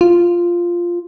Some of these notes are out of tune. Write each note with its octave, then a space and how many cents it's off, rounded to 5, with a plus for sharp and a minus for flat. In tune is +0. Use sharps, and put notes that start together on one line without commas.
F4 -5